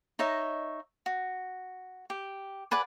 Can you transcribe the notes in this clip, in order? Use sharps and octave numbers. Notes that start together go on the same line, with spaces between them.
D#4 C#5 D#5 E5
F#4
G4
G#4 B4 D5 F#5